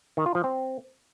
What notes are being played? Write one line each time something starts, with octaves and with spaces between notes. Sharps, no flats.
D#3
F4
F3
C4